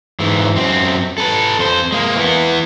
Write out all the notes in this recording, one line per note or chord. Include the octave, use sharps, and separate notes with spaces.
G#2 E3
F#2 C4
A4 B4
F2 C5
G#3 A#3
E3 B3